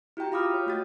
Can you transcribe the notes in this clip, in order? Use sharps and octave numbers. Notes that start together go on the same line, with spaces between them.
E4 F#4 G4 G5 A#5
F4 F5 B5 D6 D#6 F6
C#5
A3 F#4 A6